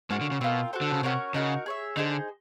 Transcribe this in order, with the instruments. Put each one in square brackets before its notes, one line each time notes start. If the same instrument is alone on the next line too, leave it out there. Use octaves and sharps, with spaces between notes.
[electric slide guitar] G#2 G#3 [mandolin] A#3 C#4 F#4
[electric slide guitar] D3
C#3
[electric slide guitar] B2 [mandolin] C4 F4 A#4
[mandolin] F#4 A4 C5
[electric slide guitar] D3
C#3
[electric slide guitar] C3 [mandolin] C#4 F#4 A#4 C#5
[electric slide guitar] C#3 [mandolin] D#4 F#4 A#4
[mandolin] G#4 C#5 E5
[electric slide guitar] D3 [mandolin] D#4 G#4 C5